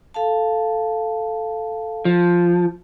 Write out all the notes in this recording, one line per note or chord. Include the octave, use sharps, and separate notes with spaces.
A4 F5 A5
F3